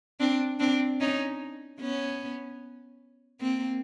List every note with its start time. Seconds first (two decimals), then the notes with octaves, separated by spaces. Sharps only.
0.20 C4 D4
0.60 C4 D4
1.00 C#4 D#4
1.80 B3 C#4
3.41 A#3 C4